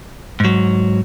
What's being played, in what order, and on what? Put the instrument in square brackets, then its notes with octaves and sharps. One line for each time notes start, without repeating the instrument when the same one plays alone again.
[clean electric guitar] G#2 F#3